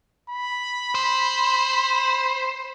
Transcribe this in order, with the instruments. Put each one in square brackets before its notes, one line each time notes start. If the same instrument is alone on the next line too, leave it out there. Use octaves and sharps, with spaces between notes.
[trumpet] B5
[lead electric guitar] C5